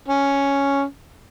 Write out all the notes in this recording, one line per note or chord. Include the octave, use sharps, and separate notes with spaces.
C#4